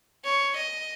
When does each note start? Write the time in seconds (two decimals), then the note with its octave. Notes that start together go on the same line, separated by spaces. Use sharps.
0.24 C#5
0.56 D#5